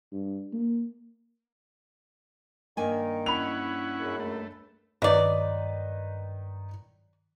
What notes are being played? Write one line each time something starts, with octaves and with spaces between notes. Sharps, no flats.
G2
A#3
G2 D#3 A#3 G#5
C#4 E4 F#5 B5 F7
C#2 F#2
A3
G2 D#3 F#3 D#4 B4 D5